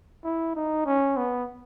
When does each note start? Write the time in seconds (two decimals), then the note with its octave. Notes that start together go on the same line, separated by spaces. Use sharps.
0.24 E4
0.55 D#4
0.86 C#4
1.17 B3